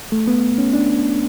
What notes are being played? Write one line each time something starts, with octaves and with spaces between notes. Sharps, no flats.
A3
B3
C#4
D4